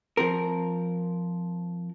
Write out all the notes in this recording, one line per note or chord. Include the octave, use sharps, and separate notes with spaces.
F3 C4 A#4